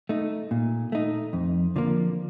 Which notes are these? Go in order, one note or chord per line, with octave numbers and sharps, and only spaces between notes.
A3 D#4
A#2
A3 D#4
F2
D3 F3 A#3